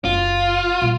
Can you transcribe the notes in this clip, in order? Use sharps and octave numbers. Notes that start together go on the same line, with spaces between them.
F#1 F4
A#2 G3